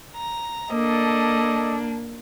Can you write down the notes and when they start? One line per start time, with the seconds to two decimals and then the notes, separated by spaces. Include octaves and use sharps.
0.16 A#5
0.71 A#3 D4 A4 D5 D#5